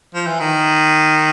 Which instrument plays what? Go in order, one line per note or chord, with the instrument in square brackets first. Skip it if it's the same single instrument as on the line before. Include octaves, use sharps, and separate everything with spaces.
[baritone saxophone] F3
E3
D#3